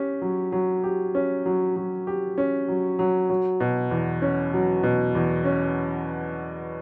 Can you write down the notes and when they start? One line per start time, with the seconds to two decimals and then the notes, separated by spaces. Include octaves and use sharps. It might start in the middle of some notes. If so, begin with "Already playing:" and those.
Already playing: C#4 G4
0.22 F#3
0.52 F#3
0.84 G4
1.15 C#4
1.46 F#3
1.76 F#3
2.07 G4
2.38 C#4
2.68 F#3
2.99 F#3
3.30 F#3
3.60 B2
3.91 E2
4.22 C#4
4.53 F#3
4.83 B2
5.15 E2
5.45 C#4